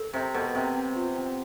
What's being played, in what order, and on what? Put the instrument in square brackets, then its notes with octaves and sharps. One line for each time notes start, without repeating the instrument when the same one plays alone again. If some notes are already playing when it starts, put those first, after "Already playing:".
Already playing: [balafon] A4
[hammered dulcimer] C3 [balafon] C4
[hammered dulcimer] B2 [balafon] A4
[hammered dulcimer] C3 [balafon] C4
[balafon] C4
F4
C4